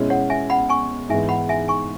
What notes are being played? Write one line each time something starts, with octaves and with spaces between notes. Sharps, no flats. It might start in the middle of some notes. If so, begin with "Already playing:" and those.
Already playing: B2 G#3 C#4 E4
C#5 F#5
E5 G#5
F#5 B5
G#5 C#6
G#2 E3 G#3 B3 E5 G#5
F#5 B5
E5 G#5
G#5 C#6